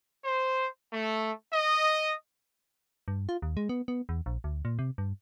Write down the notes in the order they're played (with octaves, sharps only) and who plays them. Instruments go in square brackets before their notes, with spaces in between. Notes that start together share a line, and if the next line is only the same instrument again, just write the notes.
[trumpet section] C5
A3
D#5
[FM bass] G2
F4
D#2
G#3
B3
B3
E2
A#1
D2
A#2
C3
G2